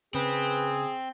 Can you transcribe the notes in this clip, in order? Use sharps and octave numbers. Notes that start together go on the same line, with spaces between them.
C#3 C4 G#4 B4